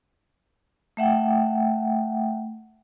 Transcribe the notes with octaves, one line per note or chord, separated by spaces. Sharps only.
A3 E5 F#5 G5